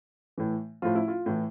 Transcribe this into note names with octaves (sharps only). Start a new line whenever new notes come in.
A2 E3
A2 F3 F4
E4
F4
A2 E3